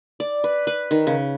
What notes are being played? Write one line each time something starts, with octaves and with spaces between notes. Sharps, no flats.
D5
B4
B4
D#3
C#3